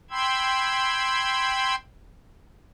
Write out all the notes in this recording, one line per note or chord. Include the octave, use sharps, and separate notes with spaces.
G5 B5 C6 E6 G#6